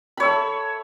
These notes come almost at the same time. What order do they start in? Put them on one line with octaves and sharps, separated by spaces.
B5 C#5 E5 A4